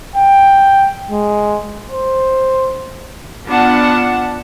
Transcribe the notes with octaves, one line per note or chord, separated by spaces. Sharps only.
G5
G#3
C5
B3 D4 F4 F#5 A5